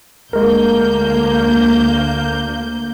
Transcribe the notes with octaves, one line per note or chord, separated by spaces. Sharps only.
D2 G#3 A#3 A#4 G6